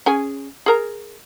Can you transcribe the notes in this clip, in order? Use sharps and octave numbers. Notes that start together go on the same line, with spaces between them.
C#4 G#4 G#5
G#4 A#4 A#5